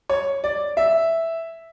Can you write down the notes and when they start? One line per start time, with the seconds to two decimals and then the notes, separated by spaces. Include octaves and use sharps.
0.10 C#5
0.44 D5
0.77 E5